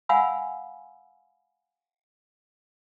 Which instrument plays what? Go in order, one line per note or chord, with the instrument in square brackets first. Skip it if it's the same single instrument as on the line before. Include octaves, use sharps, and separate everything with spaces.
[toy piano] F5 F#5 G#5 B5 E6